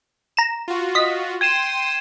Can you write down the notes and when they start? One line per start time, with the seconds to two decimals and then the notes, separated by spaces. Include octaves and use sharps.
0.37 A#5 E7
0.68 F4 F#4
0.95 D#5 B6
1.41 G5 C6 G#6 D#7 E7